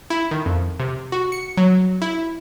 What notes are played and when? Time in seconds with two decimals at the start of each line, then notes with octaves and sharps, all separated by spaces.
0.10 E4
0.31 D#3
0.46 F2
0.79 C3
1.12 F#4
1.32 C#7
1.57 F#3
2.02 E4